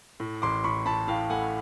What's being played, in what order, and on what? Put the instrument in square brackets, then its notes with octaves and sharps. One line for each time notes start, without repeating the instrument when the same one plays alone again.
[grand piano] A2
A1 C6 D6
A2 B5 C#6
A2 A5 B5
A2 F5 G5
A3 F#5 G#5